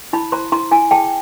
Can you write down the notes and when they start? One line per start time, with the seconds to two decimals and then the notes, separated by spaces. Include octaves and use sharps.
0.13 E4 A5 B5
0.32 C5 A#5 C6
0.52 E4 A#5 C6
0.71 E4 G#5 A#5
0.91 G#4 G5 A5